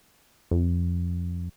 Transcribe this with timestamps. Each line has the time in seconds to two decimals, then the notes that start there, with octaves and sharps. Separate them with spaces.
0.51 F2